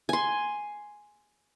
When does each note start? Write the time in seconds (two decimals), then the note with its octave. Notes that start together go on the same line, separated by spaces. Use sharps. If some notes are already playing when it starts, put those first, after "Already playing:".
0.09 G#5 C6